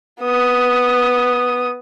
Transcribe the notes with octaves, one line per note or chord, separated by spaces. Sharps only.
B3 D#6